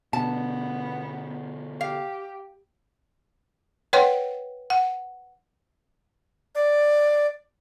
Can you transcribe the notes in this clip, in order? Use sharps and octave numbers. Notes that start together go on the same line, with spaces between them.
B2 D3 B3 A5
G4 F5
B4 C#5 F#5 G5 C6
F#5
D5